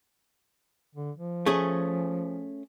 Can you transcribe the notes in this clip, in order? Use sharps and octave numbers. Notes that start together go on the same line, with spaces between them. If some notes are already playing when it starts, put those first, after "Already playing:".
D3
F3
A3 C#4 G#4